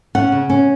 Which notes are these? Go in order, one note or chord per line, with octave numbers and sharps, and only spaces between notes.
C#4 F#5
C#3
C#4